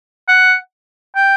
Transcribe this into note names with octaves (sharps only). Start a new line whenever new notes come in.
F#5
G5